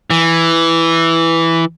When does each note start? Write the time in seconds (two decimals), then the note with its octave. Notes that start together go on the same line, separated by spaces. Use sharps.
0.10 E3